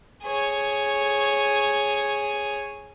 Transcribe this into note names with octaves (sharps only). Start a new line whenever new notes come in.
G#4 C#5